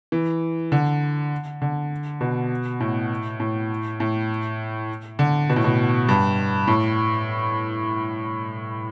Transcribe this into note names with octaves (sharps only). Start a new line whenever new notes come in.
E3
D3
D3
B2
A2
A2
A2
D3
B2
A2
B2
G2
A2